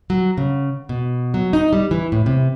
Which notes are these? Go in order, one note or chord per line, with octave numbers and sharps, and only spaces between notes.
F#3
C#3
B2
F#3
D#4
G3
E3
A2
C3